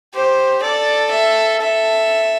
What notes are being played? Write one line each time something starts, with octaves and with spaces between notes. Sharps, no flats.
G4 C5
A4 D5
E5
A4 E5